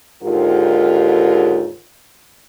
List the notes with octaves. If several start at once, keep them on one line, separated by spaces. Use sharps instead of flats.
D#2 G#2 D3 F4 G4 A#4